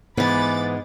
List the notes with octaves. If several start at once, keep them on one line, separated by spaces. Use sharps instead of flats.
G#2 E3 B3 B5 D6 A6